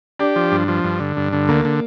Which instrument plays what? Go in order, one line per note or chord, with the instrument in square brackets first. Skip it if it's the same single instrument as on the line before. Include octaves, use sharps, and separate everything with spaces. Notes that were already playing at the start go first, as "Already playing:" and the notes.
[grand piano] D4 [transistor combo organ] G4
[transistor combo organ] F3
G2
F3
G2
D3
G2
D3
[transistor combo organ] D2 [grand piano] A#3
[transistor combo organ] D3